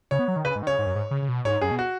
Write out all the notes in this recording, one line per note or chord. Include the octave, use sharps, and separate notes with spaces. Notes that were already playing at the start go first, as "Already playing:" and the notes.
C#3 C#5
B3
F#3
D#3
C#3 B4
G#2
D#3
C#3 C#5
G#2
F#2
G#2
C#3
C#3
B2
G#2 C#5
F#2 G#4
B2
F#4